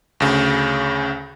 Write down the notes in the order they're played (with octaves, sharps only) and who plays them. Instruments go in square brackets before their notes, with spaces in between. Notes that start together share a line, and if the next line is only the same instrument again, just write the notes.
[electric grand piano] D2 C#3